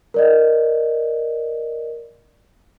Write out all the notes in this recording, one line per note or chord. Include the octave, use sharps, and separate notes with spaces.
A#4 D5 D#5